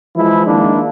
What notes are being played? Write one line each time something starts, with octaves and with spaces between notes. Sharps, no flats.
E3 F3 G#3 E4
D#3 G#3 A#3 D4